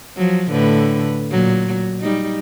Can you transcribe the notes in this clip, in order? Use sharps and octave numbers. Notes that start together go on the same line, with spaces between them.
F3 F#3
A2 D3 B4
A#2 F#3
G3 D#4